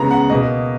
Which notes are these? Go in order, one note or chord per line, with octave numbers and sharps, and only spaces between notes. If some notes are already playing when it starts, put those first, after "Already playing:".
Already playing: C#3 G#3 B3 A#5
F#5
B2 A#3 D#5